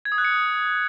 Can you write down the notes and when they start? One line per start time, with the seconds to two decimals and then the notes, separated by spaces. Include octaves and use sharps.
0.05 G#6
0.12 D#6
0.18 F#6
0.25 C#7
0.31 D#6